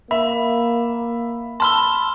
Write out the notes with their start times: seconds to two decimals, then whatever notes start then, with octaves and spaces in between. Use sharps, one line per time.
0.11 A#3 E5 B5
1.60 A5 B5 C6 E6 F6 G7